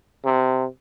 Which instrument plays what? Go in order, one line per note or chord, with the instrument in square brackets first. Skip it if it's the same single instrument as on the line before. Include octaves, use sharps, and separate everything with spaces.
[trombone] C3